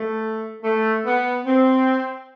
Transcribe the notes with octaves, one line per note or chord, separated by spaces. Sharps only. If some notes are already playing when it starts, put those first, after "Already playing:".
Already playing: A3
A3
B3
C4